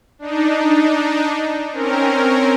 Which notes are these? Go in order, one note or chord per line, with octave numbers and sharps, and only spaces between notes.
D4 D#4
C4 C#4 A#4